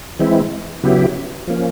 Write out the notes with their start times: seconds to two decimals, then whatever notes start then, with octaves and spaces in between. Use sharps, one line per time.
0.19 E3 G#3 C4 E4
0.84 C#3 F#3 B3 E4 G4
1.48 F3 A#3 C#4